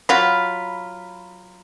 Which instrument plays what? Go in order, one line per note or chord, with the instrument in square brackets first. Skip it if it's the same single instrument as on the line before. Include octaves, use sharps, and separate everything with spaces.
[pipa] F#3 F4 [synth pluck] B5 B6